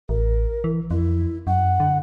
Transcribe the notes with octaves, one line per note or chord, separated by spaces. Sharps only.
A1 A#4
E3
F2 E4
F#2 F#5
D3